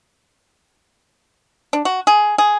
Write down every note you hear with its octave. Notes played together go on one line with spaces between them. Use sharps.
D4
F#4
G#4
G#4